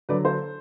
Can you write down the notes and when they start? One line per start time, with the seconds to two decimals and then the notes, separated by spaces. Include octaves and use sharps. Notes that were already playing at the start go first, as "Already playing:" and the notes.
0.09 D3 F#3 B4 D5
0.25 A4 C5